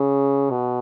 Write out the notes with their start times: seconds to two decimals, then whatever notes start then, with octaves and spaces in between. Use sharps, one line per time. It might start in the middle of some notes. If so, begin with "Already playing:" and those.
Already playing: C#3
0.50 B2